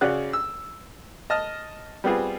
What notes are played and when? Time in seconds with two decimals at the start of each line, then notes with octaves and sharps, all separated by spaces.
0.01 C#3 C#4 F#4 G#4 D5 F#6
0.33 E6
1.30 D#5 A5 F6
2.04 G3 B3 C4 F4 G#4